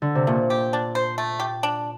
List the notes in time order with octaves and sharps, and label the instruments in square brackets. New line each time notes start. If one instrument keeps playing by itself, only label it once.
[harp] D3
C3
[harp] A#2 [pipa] A3
[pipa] G4
D4
C5
A3
G4
D4